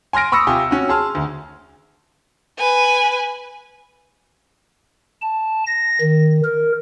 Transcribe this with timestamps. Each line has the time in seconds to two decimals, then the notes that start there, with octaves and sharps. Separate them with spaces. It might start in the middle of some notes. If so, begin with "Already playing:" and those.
0.13 G#5 C6 F6 A#6 D7
0.32 B5 C#6 D#6 E6 A#6 C#7
0.47 C3 F4 G4 G#5
0.71 C#4 F#4
0.89 G#4 A5 C6 F6
1.15 D2
2.58 B4 G#5
5.22 A5
5.67 A#6
6.02 D#3
6.45 A#4